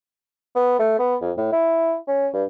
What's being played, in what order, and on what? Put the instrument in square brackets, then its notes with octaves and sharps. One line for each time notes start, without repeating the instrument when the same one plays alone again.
[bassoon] B3
A3
B3
F2
A2
E4
C#4
G2